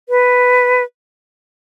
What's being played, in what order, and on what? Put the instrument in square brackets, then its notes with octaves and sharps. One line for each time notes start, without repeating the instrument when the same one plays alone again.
[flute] B4